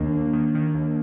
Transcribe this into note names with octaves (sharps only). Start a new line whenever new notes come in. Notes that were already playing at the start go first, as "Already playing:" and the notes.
Already playing: D#2 D#3 A#3 D4
D#2
D#3
D#3
D#2